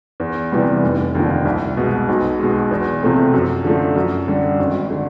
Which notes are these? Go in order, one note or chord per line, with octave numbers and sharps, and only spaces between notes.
E2
C3 E3 G3 B3
F1
D#2 D3 F3
C2
B2 G#3
B1
B2 G#3
E2
C3 F3 A3 C4
F#2
D3 F3 A3
F#2
D3 G3
G#1
D3